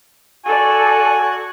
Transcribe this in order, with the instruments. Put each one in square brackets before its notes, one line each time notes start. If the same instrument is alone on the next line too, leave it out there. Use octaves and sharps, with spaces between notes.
[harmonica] F#4 G#5 [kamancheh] A4 D5